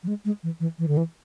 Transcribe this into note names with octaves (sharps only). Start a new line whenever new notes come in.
F3
G#3
G#3
E3
E3
E3
D3
E3